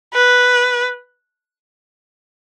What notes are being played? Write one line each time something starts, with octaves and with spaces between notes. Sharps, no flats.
B4